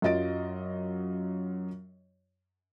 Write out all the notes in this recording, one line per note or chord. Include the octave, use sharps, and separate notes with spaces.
F#2 F4 D#5 A6 D7